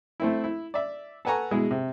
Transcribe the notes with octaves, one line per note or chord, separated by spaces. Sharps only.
A3 C4 E4
E4
D5 E5
A4 B4 F#5 G#5 A#5 C#6
B2 G#3 E4 G#4
C3